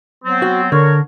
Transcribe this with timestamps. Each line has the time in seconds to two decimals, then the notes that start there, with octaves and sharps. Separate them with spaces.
0.25 F#3 B3 C4
0.42 F#4
0.72 D3 A#4 C#5